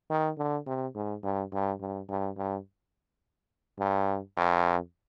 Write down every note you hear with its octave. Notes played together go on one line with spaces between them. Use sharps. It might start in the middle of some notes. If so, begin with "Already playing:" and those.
D#3
D3
C3
G#2
G2
G2
G2
G2
G2
G2
F2